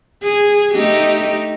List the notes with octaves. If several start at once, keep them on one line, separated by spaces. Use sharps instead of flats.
G#4
A3 D#4 G4